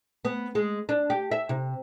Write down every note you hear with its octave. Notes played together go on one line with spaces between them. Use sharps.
B3
G#3
D4
G4
E5
C3